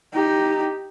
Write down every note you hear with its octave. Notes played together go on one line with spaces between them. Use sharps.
D#4 G4